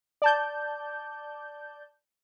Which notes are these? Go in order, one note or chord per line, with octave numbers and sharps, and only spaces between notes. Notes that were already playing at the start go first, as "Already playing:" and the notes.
D5 A5 G6